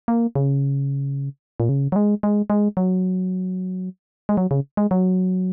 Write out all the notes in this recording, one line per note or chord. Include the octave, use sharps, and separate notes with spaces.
A#3
C#3
A#2
C#3
F#3
G#3
G#3
G#3
F#3
G#3
F#3
C#3
G#3
F#3